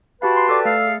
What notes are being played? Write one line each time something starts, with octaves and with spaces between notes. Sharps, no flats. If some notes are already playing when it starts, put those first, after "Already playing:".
F#4 G4 B4 F5 G5 A5 B5
C6
A4 D5 D6
A3 F5 E6
G#4 A4